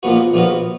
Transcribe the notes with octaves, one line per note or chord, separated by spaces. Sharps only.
A#1 A#2 F3 B3 F#4
A#1 A#2 F3 B3 F#4